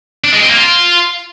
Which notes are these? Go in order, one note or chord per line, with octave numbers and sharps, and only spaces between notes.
D4
G#3
C4
A#3
F4